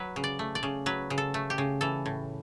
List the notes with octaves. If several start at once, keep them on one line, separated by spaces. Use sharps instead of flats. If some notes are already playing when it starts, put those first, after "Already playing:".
Already playing: F#3 B4
C#3
D5
A3
D5
C#3
F#3 B4
C#3
A4
A3
G4
C#3
E3 A4
A2